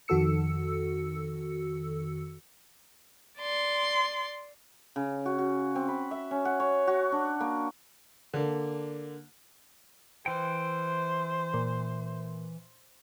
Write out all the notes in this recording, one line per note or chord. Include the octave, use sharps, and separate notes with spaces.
F2 D#3 F#4 A4 E6 C#7
D5 C6
C#3
F#4
F#4
C4
B5
E5
C#4
F#5
C#5
F#4
D4
A#3
D3 A#3
E3 C5 G5
A#2